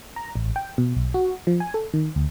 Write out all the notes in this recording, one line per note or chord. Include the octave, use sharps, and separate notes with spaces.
A#5
A1
G5
B2
B1
F#4
F3
G#5
A4
D#3
D2